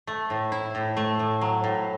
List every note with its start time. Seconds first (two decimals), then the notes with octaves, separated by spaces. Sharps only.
0.07 A3
0.30 A2
0.52 E4
0.75 A2
0.97 A3
1.19 A2
1.41 F#3
1.64 A2